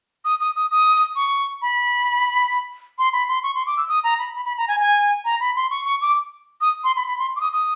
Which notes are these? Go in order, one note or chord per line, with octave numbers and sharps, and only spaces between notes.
D#6
D#6
D#6
D#6
C#6
B5
C6
B5
C6
C#6
C6
D6
E6
D#6
A#5
B5
B5
B5
A#5
G#5
G#5
A#5
B5
C6
C#6
C#6
D6
D#6
C6
B5
B5
C6
D6
D#6
D#6